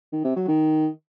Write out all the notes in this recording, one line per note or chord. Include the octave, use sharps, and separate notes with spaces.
D#3
C3
F#3
D#3